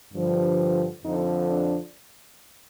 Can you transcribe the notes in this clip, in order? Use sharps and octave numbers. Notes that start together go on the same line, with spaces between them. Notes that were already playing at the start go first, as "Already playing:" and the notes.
G2 D3 F3
F2 D3 F3 D#4
D4